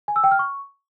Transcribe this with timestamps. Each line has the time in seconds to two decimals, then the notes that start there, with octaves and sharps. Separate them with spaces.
0.08 G#5
0.16 E6
0.24 G5
0.31 F6
0.39 C#6